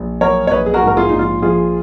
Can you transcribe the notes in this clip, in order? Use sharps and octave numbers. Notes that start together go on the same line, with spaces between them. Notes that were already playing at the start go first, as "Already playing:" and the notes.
Already playing: A#1
F#3 A#4 C#5
C#5
A#1 B4 D#5
G#4
F#4 A#4
G#2
A#4
F4 G#4
A#1 D#4
F4
F3 F4 G#4